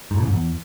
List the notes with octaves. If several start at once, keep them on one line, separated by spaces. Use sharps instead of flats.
G#2
A2
C#3
G#2
E2